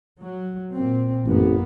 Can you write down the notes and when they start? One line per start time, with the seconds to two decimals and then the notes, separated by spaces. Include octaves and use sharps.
0.20 F#3
0.72 A#2 C4
1.26 A1 F#2 A#3 B3